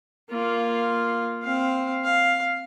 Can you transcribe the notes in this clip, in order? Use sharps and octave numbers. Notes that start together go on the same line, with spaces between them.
A#3 F4
C4 F5
F5